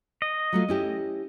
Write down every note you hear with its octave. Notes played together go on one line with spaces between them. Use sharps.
D#5
F#3 A3 F4
C#4 E4 G4